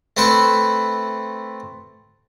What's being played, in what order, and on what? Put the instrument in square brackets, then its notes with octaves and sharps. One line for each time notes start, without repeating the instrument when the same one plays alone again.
[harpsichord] A3 C4 E4 B4 C5 C#6